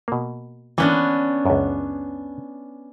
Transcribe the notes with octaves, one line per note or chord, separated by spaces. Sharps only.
B2 A#3
E3 A#3 B3 C#4 D4 E4
C#2 F#2